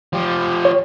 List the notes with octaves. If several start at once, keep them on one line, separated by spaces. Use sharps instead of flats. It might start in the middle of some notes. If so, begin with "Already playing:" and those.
F3 G4
C#5